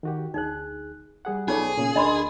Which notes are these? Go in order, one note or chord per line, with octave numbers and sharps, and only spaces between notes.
D#3 F#4 G4
D2 D#4 G#4 F#6
G3 G#4 F#5
B1 C#4 D#4 F4 G#4 A4 C#5 D5
A#2 C#3
D2 A#4 D#5 G#5 B5 C6